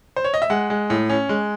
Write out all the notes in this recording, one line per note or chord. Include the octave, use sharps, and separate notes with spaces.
C5
C#5
D#5
E5
G#3 F#5
G#3
A2
C#4
G#3